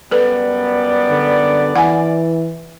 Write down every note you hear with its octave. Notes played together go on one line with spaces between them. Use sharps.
F#2 G3 B3 A4 B4 D5
D3
E3 F#5 G#5